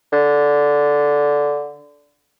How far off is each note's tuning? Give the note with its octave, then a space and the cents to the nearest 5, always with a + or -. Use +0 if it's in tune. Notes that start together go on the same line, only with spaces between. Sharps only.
D3 -10